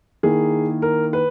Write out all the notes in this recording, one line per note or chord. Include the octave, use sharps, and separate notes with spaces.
D#3 A#3 E4 G#4
A#4
B4